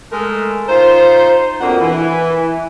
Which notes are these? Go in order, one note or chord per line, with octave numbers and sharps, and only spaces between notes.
G#3 A3 A4 A#4
D#4 F4 C5
F2 B2 A#3 D4 F#5
E3